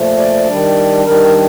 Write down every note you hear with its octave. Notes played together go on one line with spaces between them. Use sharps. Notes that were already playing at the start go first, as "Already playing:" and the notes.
Already playing: A#2 F3 A3
D5
D#3 G3 D4
D#3 G3 D4 A#4